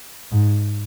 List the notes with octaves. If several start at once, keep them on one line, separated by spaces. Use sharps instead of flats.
G#2